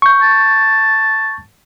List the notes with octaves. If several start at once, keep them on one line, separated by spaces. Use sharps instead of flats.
C#6 G6
A5